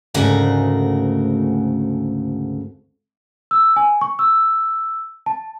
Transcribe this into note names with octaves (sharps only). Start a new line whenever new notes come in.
D2 G#2 C#3 A3 F#4 A#4
E6
G#5
C#6
E6
A5